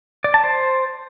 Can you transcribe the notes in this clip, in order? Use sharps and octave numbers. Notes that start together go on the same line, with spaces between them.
D5
A5
C5